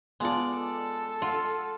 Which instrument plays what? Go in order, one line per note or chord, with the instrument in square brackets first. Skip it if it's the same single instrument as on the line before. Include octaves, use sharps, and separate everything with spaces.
[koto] G#3 D5 [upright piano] B3 F4 A5
[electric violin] A4
[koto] F4 [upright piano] F#5